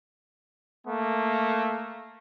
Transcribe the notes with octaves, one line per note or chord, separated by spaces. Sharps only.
A3 A#3